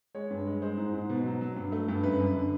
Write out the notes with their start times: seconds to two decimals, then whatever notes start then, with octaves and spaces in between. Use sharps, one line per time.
0.14 G#3 C#5
0.30 G2
0.46 G#3
0.62 G#3 C5
0.77 G#2
0.94 G#2
1.10 B2
1.25 F#3
1.41 F#3
1.56 G2
1.72 A3
1.88 G2
2.03 F#2 B4
2.20 F#2
2.35 D3